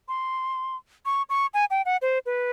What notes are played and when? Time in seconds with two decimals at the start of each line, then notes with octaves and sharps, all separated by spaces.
0.08 C6
1.05 C#6
1.29 C#6
1.54 G#5
1.71 G5
1.86 F#5
2.02 C5
2.26 B4